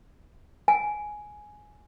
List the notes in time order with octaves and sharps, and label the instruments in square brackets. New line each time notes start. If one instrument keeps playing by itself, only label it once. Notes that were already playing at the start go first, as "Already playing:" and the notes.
[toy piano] G#5